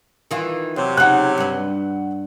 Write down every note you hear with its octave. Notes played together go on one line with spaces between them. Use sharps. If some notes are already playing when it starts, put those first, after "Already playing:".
D#3 E3 F4
E2 C3 F#3
C#3 D#4 F#5 F#6
G2 B4